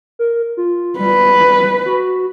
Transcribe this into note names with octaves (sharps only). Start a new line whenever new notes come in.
A#4
F4
G3 B4
F#4